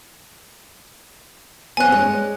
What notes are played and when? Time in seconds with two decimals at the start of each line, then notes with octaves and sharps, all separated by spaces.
1.77 B3 C4 C#5 G#5 F#6
1.92 G#3 D4 C#5